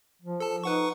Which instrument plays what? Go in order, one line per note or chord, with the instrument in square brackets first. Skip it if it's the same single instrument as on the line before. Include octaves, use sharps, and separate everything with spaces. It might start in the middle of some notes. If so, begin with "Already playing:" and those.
[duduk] F3
[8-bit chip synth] A4 A5
[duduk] D#4 [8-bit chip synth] B4 F#5 C#6